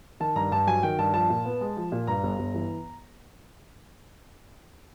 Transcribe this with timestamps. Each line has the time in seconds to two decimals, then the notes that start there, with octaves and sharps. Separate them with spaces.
0.20 D#3 A5
0.36 G2 A#5
0.51 G2 A5
0.67 F#3 G#5
0.83 D#3 G5
0.99 G2 A5
1.14 F3 A5
1.30 A#2
1.45 B3
1.61 G#3
1.77 F3
1.92 A#2
2.07 G2 A#5
2.23 G1
2.39 G1
2.54 E3